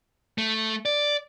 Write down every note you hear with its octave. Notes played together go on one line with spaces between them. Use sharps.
A3
D5